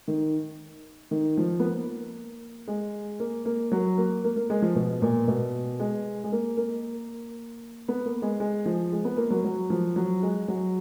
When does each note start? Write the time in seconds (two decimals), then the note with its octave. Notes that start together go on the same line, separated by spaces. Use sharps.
0.08 D#3
1.11 D#3
1.37 F3
1.60 B3
1.64 A#3
2.68 G#3
3.20 A#3
3.46 A#3
3.72 F#3
3.98 A#3
4.24 A#3
4.36 A#3
4.50 G#3
4.62 F3
4.76 B2
5.02 A#2
5.28 B2
5.80 G#3
6.24 G#3
6.32 A#3
6.57 A#3
7.88 B3
8.05 A#3
8.22 G#3
8.40 G#3
8.66 F3
8.92 G#3
9.05 B3
9.17 A#3
9.30 F#3
9.44 F#3
9.70 F3
9.96 F#3
10.23 G#3
10.48 F#3